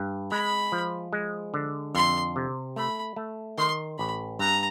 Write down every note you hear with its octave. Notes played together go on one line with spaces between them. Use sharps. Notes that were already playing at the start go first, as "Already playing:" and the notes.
Already playing: G2
G#3 B5
F3
G#3
D3
F2 C6
C3
A3 B5
A3
D#3 C6
A1 B5
G2 A#5